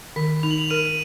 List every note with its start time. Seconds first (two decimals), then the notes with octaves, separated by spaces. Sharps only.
0.16 D#3 B6
0.43 D#4 F7
0.51 F#7
0.58 F7
0.70 A#4 D#7